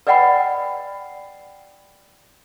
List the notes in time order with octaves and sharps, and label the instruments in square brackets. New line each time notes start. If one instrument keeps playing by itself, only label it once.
[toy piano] B4 D5 D#5 F#5 G5 B5